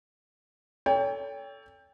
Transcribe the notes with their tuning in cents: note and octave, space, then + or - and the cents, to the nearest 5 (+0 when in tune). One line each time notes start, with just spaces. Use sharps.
A4 +0 C#5 +35 G5 +20